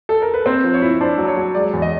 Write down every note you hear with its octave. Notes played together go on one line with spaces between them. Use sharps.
A4
A#4
B4
C4 C5
F3
C#5
E4
D4 C5
F#3
C#5
F#3
G#3 D5
E2
D#5